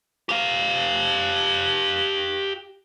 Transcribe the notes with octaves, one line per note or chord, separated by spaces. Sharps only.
G4 F5